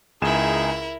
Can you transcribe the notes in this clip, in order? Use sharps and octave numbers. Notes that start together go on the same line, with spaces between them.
C#2 D#4 E4 G#4 A#4 G#5 E7